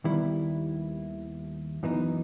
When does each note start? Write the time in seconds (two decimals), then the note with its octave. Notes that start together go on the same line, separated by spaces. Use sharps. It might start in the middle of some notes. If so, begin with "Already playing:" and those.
0.04 D#2 D#3 G3 B3 E4
1.83 F#2 E3 B3 D#4